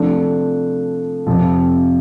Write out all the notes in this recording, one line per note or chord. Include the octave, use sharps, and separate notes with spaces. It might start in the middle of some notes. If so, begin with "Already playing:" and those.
Already playing: C3 F3 A3 D4
F2 C3 F3